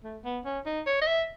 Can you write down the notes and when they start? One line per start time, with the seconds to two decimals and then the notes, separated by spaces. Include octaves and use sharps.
0.04 A3
0.25 B3
0.45 C#4
0.66 D#4
0.87 C#5
1.01 D#5
1.07 E5